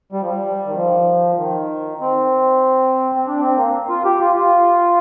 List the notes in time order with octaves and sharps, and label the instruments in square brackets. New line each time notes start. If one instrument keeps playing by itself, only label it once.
[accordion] G3
F3
G3
D#3
F3
D#3
C4
C4
D4
C4
A#3
F4
G4
F4
F4